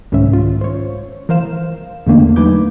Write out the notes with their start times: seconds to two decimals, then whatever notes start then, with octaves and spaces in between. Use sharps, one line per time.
0.12 C2 G#2 D#3 C#4 E5
0.33 F4
0.61 C5 C#5
1.29 E3 A#4 C5 F5 E7
2.07 E2 D3 A3 A#3 D4
2.36 F#3 D#4 B4 G#5 D6 G6